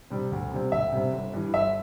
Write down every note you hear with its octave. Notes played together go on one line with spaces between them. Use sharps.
C3 G3 C4
D2
C3 G3 C4
D2 E5
C3 G3 C4
G1
G2 E3
G1 E5